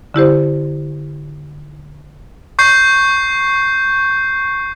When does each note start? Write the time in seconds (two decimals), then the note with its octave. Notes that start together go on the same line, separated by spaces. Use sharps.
0.14 D3 E4 G4 C5
2.59 C#6 G6 C7